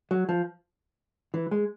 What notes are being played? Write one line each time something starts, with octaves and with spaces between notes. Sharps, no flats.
F#3
F3
E3
G#3